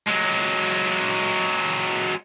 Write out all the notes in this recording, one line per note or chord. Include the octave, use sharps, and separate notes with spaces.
F#3 G#3